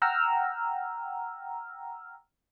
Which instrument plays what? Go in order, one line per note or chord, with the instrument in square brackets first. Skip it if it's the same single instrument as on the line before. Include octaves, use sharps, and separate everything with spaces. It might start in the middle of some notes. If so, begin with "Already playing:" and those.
[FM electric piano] F#5 G5 A#5 E6 F6